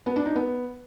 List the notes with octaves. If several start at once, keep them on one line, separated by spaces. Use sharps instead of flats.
B3
D4
D#4
B3